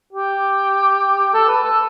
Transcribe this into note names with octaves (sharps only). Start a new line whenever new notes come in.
G4
A4
B4
A4